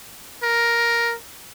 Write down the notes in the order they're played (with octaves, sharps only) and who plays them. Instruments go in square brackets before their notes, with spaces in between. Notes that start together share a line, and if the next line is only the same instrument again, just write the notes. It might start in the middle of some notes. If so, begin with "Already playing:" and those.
[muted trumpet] A#4